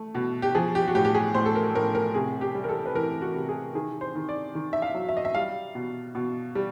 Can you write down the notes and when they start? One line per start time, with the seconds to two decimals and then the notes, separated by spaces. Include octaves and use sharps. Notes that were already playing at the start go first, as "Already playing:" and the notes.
Already playing: A3
0.15 B2
0.42 G4
0.55 F3 G#4
0.75 G4
0.88 F#4
0.95 A2 G4
1.05 G4
1.15 G#4
1.35 A2 C5
1.46 A4
1.55 A#4
1.75 A2 A#4
1.95 A#4
2.14 C3 G#4
2.41 G4
2.55 G3
2.64 A#4
2.69 A4
2.85 B4
2.94 E3 A#4
3.22 F#4
3.34 C3
3.49 G#4
3.75 D#3 G#4
4.01 C5
4.15 D#3
4.29 D5
4.55 D#3
4.73 E5
4.82 F5
4.94 F#3
5.09 E5
5.17 D#5
5.25 E5
5.35 G3 F5
5.75 B2
6.15 B2
6.55 G3